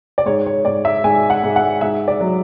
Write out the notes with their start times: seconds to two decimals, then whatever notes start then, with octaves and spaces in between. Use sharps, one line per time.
0.18 D5
0.26 G#2 C#5
0.46 C#5
0.65 G#2 D5
0.85 E5
1.04 G#2 G#5
1.30 F#5
1.44 G#2
1.56 F#5
1.81 G#2 E5
2.08 D5
2.20 F#3